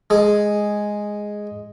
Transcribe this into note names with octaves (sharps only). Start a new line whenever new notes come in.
G#3 G#4